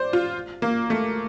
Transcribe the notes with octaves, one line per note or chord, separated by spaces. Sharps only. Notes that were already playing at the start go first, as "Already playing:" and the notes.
Already playing: C5 D5
F4
A#3
A3